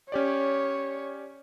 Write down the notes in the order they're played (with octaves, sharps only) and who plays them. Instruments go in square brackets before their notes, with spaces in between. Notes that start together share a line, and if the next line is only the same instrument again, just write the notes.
[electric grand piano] C#4 G4 D5 [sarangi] C#5